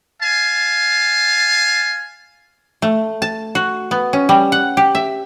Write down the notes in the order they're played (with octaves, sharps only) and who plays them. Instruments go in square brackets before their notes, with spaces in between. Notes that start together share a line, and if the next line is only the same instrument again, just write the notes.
[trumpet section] F5 G#5 A5
[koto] A3
A5
F#4
B3
C#4
G3
F#5
G4
E5